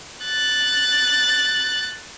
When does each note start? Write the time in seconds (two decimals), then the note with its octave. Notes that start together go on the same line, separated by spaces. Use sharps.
0.25 F#6 A6